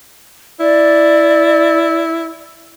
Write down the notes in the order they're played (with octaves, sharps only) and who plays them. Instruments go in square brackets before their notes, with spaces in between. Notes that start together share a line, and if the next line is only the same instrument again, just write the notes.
[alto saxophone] E4 [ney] D5